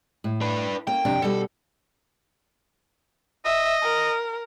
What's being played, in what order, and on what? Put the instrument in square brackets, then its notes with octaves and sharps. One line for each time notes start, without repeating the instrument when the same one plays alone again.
[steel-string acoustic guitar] A2
[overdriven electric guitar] D4 B4
[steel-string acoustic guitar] A#3 C#4 [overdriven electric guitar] G5
[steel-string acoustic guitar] F2 C3 D4
[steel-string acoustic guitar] B2 G3 [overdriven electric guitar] A4
[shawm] D#5 [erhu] E5
[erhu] A#4